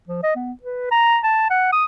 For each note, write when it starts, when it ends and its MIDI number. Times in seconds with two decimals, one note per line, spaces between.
0.07 0.20 53
0.23 0.32 75
0.36 0.52 59
0.62 0.87 71
0.91 1.18 82
1.23 1.46 81
1.50 1.71 78
1.72 1.85 87